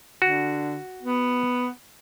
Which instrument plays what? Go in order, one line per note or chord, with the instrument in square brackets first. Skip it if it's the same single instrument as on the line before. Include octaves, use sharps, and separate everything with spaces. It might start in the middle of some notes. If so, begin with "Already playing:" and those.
[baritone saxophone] D3 [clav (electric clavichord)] F#4
[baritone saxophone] B3